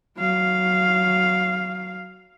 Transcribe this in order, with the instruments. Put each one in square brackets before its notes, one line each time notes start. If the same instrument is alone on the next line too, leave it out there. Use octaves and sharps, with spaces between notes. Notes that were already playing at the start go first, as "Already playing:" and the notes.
[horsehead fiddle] F#3 F5